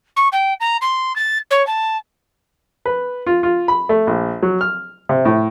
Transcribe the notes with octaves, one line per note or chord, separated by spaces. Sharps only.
C#6
G5
A#5
C6
A6
C#5
A5
B4
F4
F4
B5
A3
A#1
F#3
F6
C3
A2